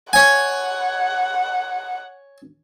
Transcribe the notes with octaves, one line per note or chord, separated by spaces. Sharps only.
C#5 F#5 G#5